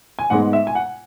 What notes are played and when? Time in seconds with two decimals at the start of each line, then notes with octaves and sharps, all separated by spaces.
0.19 G#5
0.30 G#2 G#3 B3 F#5
0.53 E5
0.67 G#5
0.75 F#5